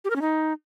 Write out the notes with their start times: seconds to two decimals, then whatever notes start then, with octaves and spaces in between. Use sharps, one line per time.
0.04 G4
0.10 A#4
0.16 C#4
0.21 D#4